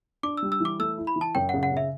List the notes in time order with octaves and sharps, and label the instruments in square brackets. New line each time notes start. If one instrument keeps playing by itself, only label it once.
[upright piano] D4 [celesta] D6
[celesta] E6
[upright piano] G3
[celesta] E6
[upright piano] E3 [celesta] D6
[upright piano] A3 [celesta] E6
[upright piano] E4
[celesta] B5
[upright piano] E3
[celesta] A5
[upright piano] F#2 [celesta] G5
[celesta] F#5
[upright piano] C#3
[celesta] F#5
[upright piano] C#3 [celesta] E5